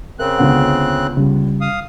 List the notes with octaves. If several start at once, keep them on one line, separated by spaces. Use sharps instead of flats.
C#3 C4 A#4 F#6
C#2 D3 B3 F#5
C#3 G3
F5 D#6